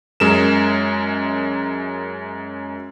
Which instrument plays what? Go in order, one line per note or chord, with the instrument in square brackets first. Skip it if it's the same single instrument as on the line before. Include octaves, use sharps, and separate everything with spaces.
[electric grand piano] F#2 G#3 A#4 E7